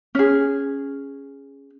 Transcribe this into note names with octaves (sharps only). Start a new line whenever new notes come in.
C#4 G#4